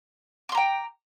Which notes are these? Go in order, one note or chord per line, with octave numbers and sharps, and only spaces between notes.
G5 A#5 C6 D6